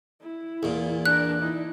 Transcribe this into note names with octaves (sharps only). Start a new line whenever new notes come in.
E4
E2 A#2
D4 A#4 F#6
D#4 E4